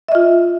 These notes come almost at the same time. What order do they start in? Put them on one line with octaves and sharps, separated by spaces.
E5 D#5 F4